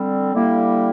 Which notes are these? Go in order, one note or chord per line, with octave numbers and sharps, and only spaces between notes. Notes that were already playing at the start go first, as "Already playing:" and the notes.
Already playing: D3 G3 C4
D3 G3 A#3 E4 G4